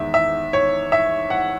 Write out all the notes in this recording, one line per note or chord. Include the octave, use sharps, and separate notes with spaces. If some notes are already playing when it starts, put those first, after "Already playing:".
Already playing: E2 D#3 G#3 E5
E5
C#5
E5
F#5